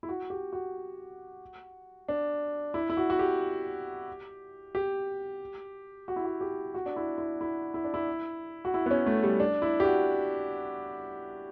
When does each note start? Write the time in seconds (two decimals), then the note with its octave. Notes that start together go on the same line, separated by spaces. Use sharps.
0.03 E4
0.09 F#4
0.30 G4
0.53 F#4
2.08 D4
2.74 E4
2.90 E4
2.97 F#4
3.10 F#4
3.19 G4
4.75 G4
6.08 F#4
6.16 E4
6.25 F#4
6.41 G4
6.74 F#4
6.86 D4
6.96 E4
7.18 E4
7.41 E4
7.74 E4
7.84 D4
7.94 E4
8.65 F#4
8.74 E4
8.86 B3
8.91 C#4
9.06 A3
9.24 G3
9.40 D4
9.62 E4
9.80 G4
9.84 F#4